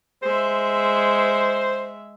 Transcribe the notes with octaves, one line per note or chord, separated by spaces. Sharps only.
G#3 C5 E5